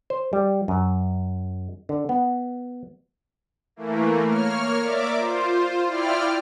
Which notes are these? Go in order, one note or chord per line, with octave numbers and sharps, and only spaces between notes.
C5
G3
F#2
D3
B3
E3 A3 A#3
A#3 C#5 F6
A#4 D5 E5 D6
F4 C5
E4 F4 D5 G5 F6